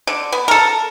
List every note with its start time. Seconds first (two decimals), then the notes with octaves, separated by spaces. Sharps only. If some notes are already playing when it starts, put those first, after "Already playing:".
0.07 D3
0.32 B3
0.48 A4 A#4